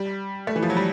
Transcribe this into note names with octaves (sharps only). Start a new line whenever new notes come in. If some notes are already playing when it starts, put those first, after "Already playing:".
Already playing: G3
A3
E3
F3
F#3
G3